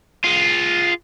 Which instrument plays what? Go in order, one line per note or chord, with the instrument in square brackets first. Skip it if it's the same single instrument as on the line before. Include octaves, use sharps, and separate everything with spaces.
[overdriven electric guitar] F4 G#4